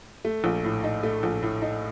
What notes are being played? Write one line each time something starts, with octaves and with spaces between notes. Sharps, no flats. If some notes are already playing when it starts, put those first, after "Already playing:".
A3
A#1
A2
D#4
A3
A#1
A2
D#4